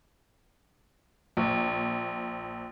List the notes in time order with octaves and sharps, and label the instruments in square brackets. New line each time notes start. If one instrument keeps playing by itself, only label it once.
[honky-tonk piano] A#1